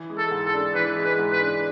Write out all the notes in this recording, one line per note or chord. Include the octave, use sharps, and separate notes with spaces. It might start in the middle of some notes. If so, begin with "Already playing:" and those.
Already playing: E3
G#3
A4
G#2
A4
D4
E3 B4
G#3
B4
G#2
B4
D4